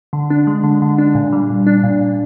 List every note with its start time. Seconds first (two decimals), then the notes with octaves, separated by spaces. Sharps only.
0.13 D3
0.30 D4
0.47 G#3
0.64 D3
0.82 D3
0.98 D4
1.15 A#2
1.32 G3
1.50 A#2
1.67 D4
1.84 A#2
2.01 A#2